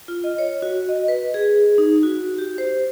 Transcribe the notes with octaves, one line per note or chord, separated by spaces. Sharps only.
F4
D#5
C#5
F#4
D#5
B4
G#4
D#4
F#4
G4
C5